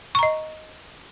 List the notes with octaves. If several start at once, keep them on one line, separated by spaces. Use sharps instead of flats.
D#5 A#5 C#6